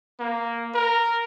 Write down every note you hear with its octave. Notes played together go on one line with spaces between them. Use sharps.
A#3
A#4